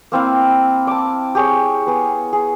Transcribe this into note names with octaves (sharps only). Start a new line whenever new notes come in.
A#3 C4 E4 F5
A5 D6
G4 G#4 C#5
B3 G#4
G#4